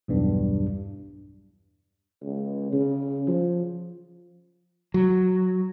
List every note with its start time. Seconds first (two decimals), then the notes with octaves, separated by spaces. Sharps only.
0.08 B1 E2 G2
2.22 C#2
2.73 C#3
3.28 F3
4.94 F#3